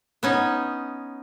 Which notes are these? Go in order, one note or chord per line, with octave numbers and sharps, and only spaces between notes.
B3 C#4 D#4